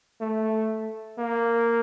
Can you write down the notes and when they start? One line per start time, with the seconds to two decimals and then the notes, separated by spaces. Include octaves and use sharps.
0.21 A3
1.19 A#3